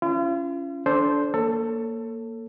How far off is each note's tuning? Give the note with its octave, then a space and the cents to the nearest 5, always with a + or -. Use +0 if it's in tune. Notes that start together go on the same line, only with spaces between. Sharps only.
C#4 +5 F4 -40
D4 -20 A4 -15 C5 +0
A#3 -5 A4 +20 C#5 +0